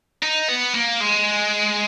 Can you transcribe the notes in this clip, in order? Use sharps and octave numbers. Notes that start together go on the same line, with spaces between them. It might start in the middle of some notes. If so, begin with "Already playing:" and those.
D#4
B3
A#3
G#3